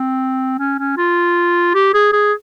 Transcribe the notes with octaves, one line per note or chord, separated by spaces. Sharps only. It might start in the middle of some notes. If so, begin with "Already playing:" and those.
Already playing: C4
C#4
C#4
F4
G4
G#4
G#4